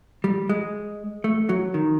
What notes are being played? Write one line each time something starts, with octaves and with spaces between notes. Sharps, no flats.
G3
G#3
A3
F#3
D#3